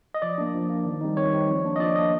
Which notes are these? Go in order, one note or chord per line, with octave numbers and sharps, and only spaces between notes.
D#5
F3 D5
A#3 D4
F3
A#3 D4
D#3
G3 C4 D#4
D#3 C#5
G3 C4 D#4
F3
A#3 D4
D#5
F3 D5
A#3 D4 D#5